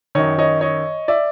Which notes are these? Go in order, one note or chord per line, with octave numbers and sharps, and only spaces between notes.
F#2 D#3 C#5 D#5
C#5 D#5
C#5 D#5
D5 E5